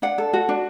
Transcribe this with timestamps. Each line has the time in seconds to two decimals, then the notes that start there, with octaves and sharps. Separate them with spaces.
0.02 D4 F#5
0.18 A4
0.33 F#4
0.49 D4